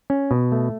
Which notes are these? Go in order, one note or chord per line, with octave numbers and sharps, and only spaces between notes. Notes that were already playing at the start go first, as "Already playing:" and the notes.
C#4
B2
A3